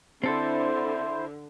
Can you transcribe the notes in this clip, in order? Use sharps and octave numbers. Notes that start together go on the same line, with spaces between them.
D3 C4 E4 A4 C5